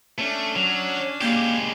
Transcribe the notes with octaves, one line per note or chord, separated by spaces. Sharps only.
A3 C#4 D4
F#3
G#3 A#3 G4